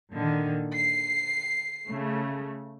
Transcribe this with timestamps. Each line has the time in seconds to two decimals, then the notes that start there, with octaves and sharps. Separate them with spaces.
0.13 A#2 D3 D#3
0.74 C7
1.89 C#3 A3